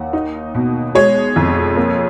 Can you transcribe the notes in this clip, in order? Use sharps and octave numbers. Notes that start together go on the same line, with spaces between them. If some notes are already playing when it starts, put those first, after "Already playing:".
Already playing: D#2 F#5
D#4
B2
G#3 C#5
F2
A#3